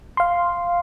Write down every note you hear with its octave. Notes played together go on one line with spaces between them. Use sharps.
F5 C6